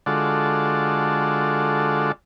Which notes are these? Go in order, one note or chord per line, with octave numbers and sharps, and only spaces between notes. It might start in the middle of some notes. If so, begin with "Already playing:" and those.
D3 G#3 F4 F#4 A4 D5